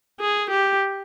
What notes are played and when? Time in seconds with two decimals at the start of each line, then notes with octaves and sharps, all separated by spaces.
0.20 G#4
0.50 G4